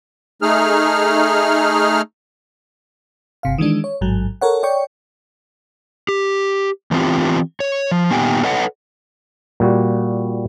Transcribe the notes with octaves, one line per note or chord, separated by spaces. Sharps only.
A3 D#4 G#4 F6
G1 C3 F5
D#3 E3 G#3 D4
C#5
A1 G#2 F#3
A4 A#4 C#5 F#5
C#5 D5 G5 C#6
G4
E3 B3 C4 F4 G4
C#5
F3
A#2 D#3 B3 G4 G5 G#5
A4 B4 C#5 D#5 F#5
A#2 G3 F#4